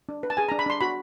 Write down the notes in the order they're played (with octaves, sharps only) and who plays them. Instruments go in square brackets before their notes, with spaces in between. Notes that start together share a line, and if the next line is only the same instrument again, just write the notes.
[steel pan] D4
B4
A5
G#4 G#5
A#5
D4
B5
D4 C6
F#4 B5